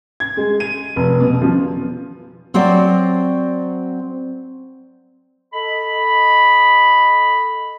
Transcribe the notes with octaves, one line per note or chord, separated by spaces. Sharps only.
G#6
G#3
D#7
F1
B2
F3
F#3 C4 F#4 C5 D5
A4 D#5 B5